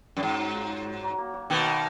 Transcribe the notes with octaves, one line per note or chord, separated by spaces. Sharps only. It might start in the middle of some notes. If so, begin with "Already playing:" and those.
F#2
G#2 F#3
F#3
F4
F#3
F#3
F#3
A#3
F#3
B2 D#3 A#3
A#3